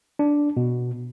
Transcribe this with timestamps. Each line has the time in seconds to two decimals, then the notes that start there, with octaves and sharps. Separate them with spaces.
0.19 D4
0.57 B2